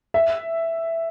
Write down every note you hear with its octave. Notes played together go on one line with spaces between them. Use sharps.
E5